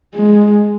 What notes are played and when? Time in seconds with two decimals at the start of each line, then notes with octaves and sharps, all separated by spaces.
0.15 G#3